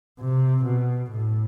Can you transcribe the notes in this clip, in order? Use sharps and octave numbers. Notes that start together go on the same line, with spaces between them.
C3
B2
A2